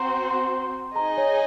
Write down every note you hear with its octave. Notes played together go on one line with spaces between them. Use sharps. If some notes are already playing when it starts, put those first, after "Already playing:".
Already playing: C4 F#4 C5 A#5 C6
C6
D#4 G#4 D#5 G#5 A#5
C#5